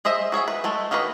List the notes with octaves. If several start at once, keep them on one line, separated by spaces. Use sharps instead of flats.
G#4 C5 D#5 E5
F#4 G#4 C#5 E5
B4
G#3 A3 A4
D#3 A#3 F#4 G#4 B4